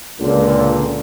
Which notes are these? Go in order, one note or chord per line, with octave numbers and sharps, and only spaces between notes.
C#2 A#2 D3